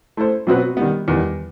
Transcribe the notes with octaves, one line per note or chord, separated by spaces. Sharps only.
A3 E4 A4 C5
B2 F#3 C4 F#4 B4
D#3 G3 B3
E2 D#3 G3